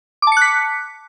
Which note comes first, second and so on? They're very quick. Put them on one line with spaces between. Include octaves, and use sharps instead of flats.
D6 A5 C#7 F#6 B6